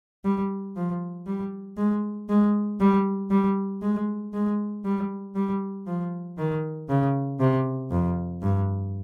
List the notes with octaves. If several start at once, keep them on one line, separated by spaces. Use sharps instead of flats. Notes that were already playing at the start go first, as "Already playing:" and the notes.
G3
F3
G3
G#3
G#3
G3
G3
G#3
G#3
G3
G3
F3
D#3
C#3
C3
F2
G2